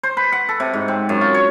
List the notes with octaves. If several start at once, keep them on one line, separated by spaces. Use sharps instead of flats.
C5
B4
F#5
A4
C3
G#2
C4
F#2
F4
C#5